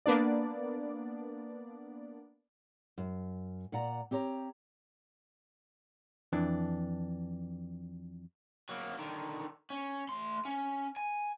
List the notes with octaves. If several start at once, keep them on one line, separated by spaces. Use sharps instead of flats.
A#3 B3 D4 D5
F#2
A#2 D5 F#5 A#5
C4 G4 C#5 A#5
F2 E3 D4
F#3 A#3
D3 D#3
C#4
A3 C6
C#4
G#5